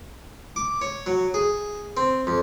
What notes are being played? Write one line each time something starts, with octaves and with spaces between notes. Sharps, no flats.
D6
C#5
F#3
G#4
C4
F2